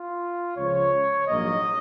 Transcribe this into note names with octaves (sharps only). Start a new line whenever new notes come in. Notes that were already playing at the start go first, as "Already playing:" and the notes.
Already playing: F4
C#2 C#3 F3 C#5
A#1 G#2 F#3 A#3 D#5